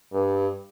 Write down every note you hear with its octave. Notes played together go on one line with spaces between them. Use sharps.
G2